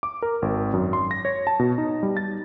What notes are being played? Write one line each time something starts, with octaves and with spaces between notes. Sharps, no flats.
D6
A#4
G#1
F#2
C6
A#6
C#5
A5
B2
D#4
G3
A6